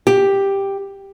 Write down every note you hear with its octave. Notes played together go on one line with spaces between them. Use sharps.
G4